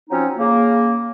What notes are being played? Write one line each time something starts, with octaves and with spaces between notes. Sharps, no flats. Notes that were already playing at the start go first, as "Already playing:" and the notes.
F3 F#3 C4 C#4 D#4
C#3 A#3